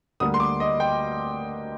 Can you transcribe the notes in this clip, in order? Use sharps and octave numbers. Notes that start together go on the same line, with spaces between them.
D2 D3 G3 A#3 D#6
C6
D6
D#5
G5